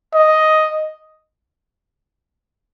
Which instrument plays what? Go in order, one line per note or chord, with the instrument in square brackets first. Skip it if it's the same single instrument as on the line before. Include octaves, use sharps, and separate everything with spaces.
[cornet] D#5